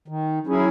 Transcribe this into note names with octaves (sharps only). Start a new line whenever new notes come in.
D#3
F#3 C#4 E4 G#4